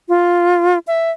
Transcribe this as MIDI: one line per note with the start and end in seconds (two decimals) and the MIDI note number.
0.09 0.79 65
0.87 1.11 76